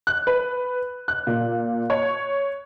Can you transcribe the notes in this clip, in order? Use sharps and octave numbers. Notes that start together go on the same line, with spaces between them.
F#6
B4
F#6
A#2
C#5